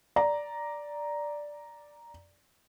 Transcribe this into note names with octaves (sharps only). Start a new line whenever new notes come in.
D5 A#5